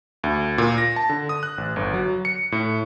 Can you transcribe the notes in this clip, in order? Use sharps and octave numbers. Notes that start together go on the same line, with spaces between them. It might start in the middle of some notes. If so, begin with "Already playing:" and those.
D2
A#2
A#6
A5
D3
D#6
F#6
A1
G1
F#3
C#7
A2